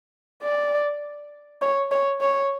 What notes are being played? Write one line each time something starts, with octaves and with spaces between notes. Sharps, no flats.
D5
C#5
C#5
C#5